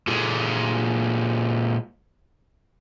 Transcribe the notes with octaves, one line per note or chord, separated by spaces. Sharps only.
A#2 G#3